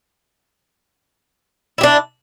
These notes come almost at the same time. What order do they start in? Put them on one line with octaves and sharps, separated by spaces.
E4 G4 D4